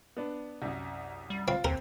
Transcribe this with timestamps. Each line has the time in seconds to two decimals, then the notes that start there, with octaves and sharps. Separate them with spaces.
0.17 B3 D4
0.62 C2 F#2
1.30 G3
1.48 C4 F4
1.65 D#2 C4 A#4